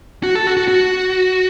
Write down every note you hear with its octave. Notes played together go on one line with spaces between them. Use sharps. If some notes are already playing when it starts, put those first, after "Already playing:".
F#4
A4
F#4
F#4
F#4